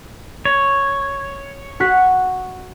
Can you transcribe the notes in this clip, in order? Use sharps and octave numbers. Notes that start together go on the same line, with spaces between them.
C#5
F#4 F#6 B6